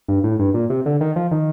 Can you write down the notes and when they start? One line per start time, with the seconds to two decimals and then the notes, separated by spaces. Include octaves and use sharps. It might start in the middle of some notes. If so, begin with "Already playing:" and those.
0.08 G2
0.24 A2
0.39 G2
0.54 A#2
0.70 C3
0.86 D3
1.01 D#3
1.16 F3
1.31 D#3